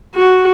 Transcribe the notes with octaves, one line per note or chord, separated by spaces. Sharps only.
F#4